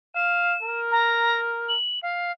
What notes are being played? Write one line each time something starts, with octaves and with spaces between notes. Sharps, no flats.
F5 E7
A#4
A#5
F#7
F5